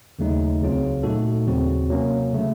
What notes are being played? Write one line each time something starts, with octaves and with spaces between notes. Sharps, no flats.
D#2 C#3 F#3 A3 D#4
C#2 C#3 F#3 C4 F4
A#2 A3 D#4 F#4 A4
D#2 C#3 F#3 C4 F#4
C3 F#3 A#3 C#4
C#3 A3